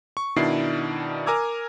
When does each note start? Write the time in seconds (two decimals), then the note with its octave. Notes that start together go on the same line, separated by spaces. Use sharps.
0.17 C#6
0.36 B2 D#3 D4 E4 D5 C7
1.26 A#4 G#5 A#5 D6 E6 G#6